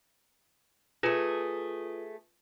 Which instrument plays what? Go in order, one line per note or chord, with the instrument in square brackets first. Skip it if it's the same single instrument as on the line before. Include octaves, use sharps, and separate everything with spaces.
[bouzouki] A3 G#4 [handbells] F4 B4